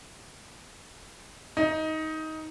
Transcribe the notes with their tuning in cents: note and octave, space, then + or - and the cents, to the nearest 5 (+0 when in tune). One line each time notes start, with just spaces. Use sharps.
D#4 +15